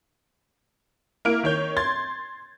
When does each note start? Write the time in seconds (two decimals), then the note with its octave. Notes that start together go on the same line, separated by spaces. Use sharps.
1.25 A#3 E4 F6 D7
1.43 D#3 C#5 G6
1.77 C6 G#6 A6